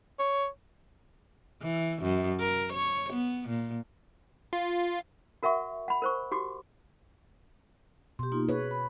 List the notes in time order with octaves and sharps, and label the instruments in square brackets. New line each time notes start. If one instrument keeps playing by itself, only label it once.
[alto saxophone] C#5
[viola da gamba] E3
F#2
A#4
C#5
B3
A#2
[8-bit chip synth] F4
[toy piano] F#4 A#4 E5 F#5 C#6
F#5 B5
A#4 C5 C#6
F#4 G4 D6
[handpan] B2 [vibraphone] G4 C6
[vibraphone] A#3 D#4 F4
[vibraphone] G#4 [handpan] B4 C#5
[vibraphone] B5